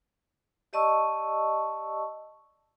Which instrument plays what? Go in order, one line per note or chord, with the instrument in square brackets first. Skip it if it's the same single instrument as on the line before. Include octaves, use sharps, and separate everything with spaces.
[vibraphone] G4 D5 D#5 A5 C#6 E6